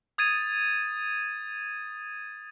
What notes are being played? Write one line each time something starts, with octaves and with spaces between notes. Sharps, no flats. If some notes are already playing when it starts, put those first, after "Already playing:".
D#6 G#6 A6 D#7